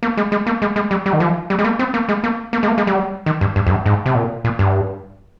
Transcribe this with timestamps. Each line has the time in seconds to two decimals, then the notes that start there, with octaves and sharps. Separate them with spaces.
0.03 A#3
0.17 G#3
0.32 G#3
0.47 A#3
0.62 G#3
0.76 G#3
0.91 G3
1.06 G3
1.13 D#3
1.20 F3
1.50 G3
1.59 G#3
1.64 A#3
1.79 C4
1.94 A#3
2.09 G#3
2.24 A#3
2.53 A#3
2.63 G#3
2.68 A#3
2.78 G#3
2.87 G3
3.26 D#3
3.41 G2
3.56 G2
3.67 F2
3.71 G2
3.86 G#2
4.06 C3
4.15 A#2
4.44 A#2
4.59 G2